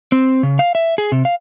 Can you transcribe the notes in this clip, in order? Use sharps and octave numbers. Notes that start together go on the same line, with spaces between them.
C4
C#3
F5
E5
G#4
C3
F5